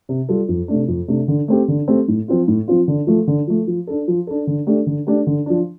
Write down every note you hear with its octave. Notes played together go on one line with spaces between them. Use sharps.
C3
G3 F4 A4
F2
C3 A3 D4
F2
C3 A3 D4
D3
A3 C4 G4
D3
A3 C4 G4
A2
F3 C4 F4
A2
F3 C4 F4
D3
F3 A3
D3
F3 A3
F3
D4 A4
F3
D4 A4
D3
A3 D4 G4
D3
A3 D4 G4
D3
F3 D4